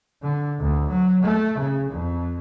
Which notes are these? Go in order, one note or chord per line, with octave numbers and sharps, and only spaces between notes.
D3
D2
F#3
A3
C#3
F2